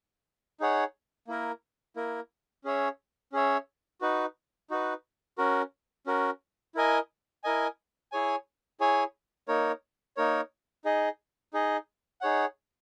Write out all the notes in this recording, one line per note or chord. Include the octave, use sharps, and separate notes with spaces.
D#4 G#4 C#5 F#5
A#3 E4 A#4
A#3 E4 A#4
C#4 G#4 C#5 E5
C#4 G#4 C#5 E5
D#4 F#4 B4
D#4 F#4 B4
C#4 F#4 A#4
C#4 F#4 A#4
E4 A#4 D#5 G#5
E4 A#4 D#5 G#5
E4 G#4 C#5 G#5
E4 G#4 C#5 G#5
A#3 D#4 A#4 C#5
A#3 D#4 A#4 C#5
D#4 G#4 D#5
D#4 G#4 D#5
D#4 G#4 C#5 F#5